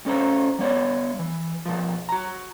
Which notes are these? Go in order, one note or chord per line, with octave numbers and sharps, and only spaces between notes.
A2 C#4 A4 C5 A#5
G3 B3 C#5 D5
E3
B2 F3
F#4 A#5